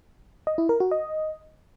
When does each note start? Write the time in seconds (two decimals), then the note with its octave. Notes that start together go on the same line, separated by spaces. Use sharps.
0.47 D#5
0.58 E4
0.69 A#4
0.80 F#4
0.91 D#5